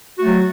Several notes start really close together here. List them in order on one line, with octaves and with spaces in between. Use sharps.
F#4 A3 F#3